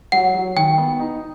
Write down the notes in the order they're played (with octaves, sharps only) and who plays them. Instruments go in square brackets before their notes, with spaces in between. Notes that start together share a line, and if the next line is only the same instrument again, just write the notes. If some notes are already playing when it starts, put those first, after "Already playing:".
[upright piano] F#3 [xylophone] F#5
[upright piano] F#3
[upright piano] D#3 [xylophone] G5
[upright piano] B3
D#4